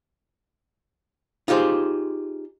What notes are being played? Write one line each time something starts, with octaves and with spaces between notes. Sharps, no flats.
D#4 F4 G4 G#4 C5